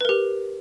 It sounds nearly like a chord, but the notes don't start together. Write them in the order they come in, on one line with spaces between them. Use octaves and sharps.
B4 A#4 G4